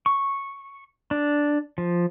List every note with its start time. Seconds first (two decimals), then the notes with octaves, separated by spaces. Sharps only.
0.06 C#6
1.11 D4
1.78 F3